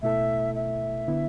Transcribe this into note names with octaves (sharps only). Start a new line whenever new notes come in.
B2 A3 E4 A4 E5
E5
D3 B3 E4